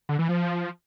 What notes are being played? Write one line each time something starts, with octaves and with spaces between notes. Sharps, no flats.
D3
E3
F3